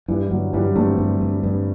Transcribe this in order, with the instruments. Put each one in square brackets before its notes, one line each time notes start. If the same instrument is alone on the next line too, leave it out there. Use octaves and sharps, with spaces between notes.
[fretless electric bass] G2 [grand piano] E3 G3
[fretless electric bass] G2 [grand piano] D3 F#3
[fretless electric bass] G2 [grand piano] E3 G3
[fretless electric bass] G2 [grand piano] A3 C4
[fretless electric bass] G2
G2
G2